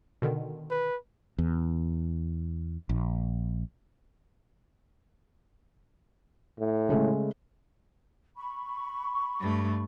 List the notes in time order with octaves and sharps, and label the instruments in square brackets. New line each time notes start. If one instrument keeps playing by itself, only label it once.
[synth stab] B2 D3 D#3
[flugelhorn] B4
[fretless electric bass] E2
A#1
[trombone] A2
[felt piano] C#3 G#3 A3
[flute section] B5 C#6
[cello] G2 A3